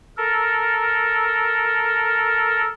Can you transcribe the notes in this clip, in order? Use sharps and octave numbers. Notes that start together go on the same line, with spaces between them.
A4 A#4